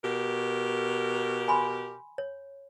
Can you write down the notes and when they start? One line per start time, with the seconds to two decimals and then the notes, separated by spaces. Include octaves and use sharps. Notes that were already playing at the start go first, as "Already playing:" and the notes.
0.04 B2 G4 A#4
1.48 G#5 B5 C6
2.18 C#5